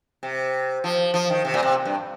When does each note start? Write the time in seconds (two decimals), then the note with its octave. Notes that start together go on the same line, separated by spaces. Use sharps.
0.23 C3
0.84 F3
1.14 F3
1.30 D#3
1.45 C3
1.54 A#2
1.63 C3
1.85 G2